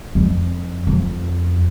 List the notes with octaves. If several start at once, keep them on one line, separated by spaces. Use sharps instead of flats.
F2
F2